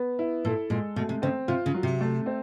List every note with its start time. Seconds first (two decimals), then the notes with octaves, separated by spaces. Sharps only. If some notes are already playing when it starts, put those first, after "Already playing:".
Already playing: B3
0.19 E4
0.45 A#2 A4
0.70 A#2 G#3
0.96 B2 A3
1.09 C3
1.22 C#3 C4
1.48 C3 F4
1.66 C#3
1.74 F#3
1.83 C3
2.01 A3
2.26 C4